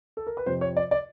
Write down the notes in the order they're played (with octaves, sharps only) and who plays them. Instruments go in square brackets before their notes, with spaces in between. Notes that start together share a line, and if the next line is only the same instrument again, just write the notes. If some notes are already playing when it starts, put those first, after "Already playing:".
[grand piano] A4
A#4
B4
F2 C3 F3 C5
C#5
D5
D5